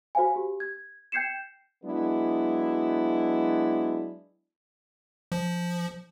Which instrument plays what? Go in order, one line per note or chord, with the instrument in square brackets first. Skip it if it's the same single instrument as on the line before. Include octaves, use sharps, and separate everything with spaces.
[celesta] F#4 C5 F5 G#5
G4
G#6
G5 G6 G#6 C7 C#7 E7
[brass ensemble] F#3 G#3 B3 D4 E4
[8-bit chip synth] F3